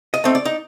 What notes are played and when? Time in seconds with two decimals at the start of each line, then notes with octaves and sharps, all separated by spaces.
0.14 D#5
0.24 A3 C4 D#4
0.35 D5
0.45 D#4